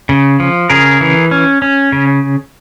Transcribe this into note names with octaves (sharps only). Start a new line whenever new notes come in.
C#3
F3
C#3 G#4 A#4
E3
C#4
C#4
C#3